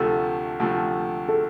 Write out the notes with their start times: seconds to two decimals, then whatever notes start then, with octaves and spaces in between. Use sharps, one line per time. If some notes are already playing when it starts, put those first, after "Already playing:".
Already playing: D2 C3 F3 A3 A4
0.60 D2 C3 F3 A3
1.28 A4